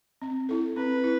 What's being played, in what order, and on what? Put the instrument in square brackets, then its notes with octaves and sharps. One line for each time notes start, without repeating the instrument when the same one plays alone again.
[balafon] C4
E4 A4
[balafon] C4 [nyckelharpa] B4
[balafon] E4